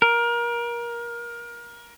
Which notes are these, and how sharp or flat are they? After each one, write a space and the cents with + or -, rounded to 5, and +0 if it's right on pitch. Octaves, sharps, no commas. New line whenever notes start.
A#4 +25